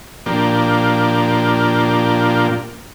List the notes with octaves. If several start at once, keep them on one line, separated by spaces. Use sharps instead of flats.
A#2 F3 A#3 D4 G4